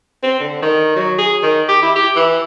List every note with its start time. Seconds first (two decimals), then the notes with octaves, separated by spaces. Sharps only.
0.23 C4
0.40 D3
0.62 D#3
0.96 F#3
1.18 G#4
1.43 D#3
1.69 G4
1.82 E4
1.96 G4
2.16 E3